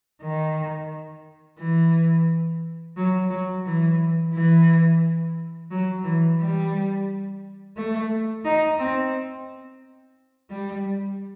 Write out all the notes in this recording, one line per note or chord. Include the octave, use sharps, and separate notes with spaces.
D#3
E3
F#3
F#3
E3
E3
F#3
E3
G3
A3
D#4
C4
G3